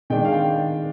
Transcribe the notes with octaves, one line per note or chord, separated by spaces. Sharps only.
D#3 G#3 D4 G5
F5
G5